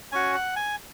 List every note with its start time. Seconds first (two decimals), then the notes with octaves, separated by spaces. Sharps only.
0.12 C#4 F#4 G#5
0.35 F#5
0.56 G#5